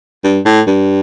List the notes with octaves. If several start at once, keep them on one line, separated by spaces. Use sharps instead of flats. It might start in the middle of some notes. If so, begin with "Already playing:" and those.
G2
A2
G2